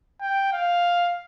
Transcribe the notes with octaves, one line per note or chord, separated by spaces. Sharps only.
G5
F5